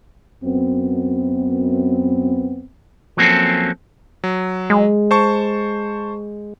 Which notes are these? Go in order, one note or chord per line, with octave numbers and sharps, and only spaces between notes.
F#2 B3 C4
F3 F#3 A#3 C4 C#4 A4
F#3
G#3
C5 A5 C#6